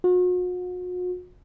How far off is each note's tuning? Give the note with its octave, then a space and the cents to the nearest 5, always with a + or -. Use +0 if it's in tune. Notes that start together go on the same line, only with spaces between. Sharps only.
F#4 -40